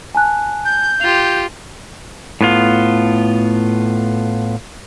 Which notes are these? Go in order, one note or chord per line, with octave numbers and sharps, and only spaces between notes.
G#5 A5 F#6
G6
F4 G4 F7
A2 B3 F4